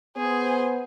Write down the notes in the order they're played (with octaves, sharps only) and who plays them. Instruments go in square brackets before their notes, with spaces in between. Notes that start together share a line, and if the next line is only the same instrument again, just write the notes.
[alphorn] B3 [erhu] G#4 [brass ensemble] C5